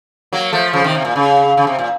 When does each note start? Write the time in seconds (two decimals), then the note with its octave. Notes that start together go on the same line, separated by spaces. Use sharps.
0.33 F#3 A#3
0.53 F3 A3
0.73 C#3 F3
0.84 C3 D#3
0.95 C3
1.05 A#2
1.16 C#3
1.57 C#3
1.67 C3
1.79 A#2